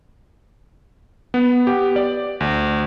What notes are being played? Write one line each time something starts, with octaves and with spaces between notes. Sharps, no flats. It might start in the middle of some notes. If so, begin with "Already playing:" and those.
B3
G4
D5
D2